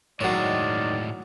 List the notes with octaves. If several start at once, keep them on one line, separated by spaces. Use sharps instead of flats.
A2 D#3 F#3 G#3 C#5 D5